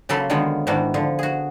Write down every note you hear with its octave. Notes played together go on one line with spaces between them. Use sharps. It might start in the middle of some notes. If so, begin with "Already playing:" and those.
C#3 F#3 A#3 A4 B5 C6
D3 D#3 F#3 G#3 B3 F4
G#2 D#3 E3 D4 F#4
D3 F3
F#4 G#4